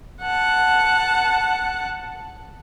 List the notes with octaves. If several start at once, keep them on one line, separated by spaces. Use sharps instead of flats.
F#5 A5